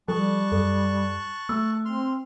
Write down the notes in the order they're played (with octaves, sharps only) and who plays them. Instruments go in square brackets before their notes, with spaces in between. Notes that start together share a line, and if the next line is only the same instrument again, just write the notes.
[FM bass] F3 [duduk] G3 [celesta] A4 [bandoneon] A5 C#6 F#6
[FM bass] F#2 [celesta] A4
[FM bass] A3 [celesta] E6
[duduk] C4 [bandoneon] C6 F6